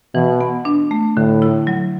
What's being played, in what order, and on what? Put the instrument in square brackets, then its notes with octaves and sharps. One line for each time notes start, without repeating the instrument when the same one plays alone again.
[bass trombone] B2 [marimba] E3
[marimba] B3
D4
A3
[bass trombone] A2 [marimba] D3
[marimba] E4
F#3